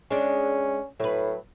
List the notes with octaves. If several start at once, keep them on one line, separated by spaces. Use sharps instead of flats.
G#3 C#4 D4
A2 F#3 B4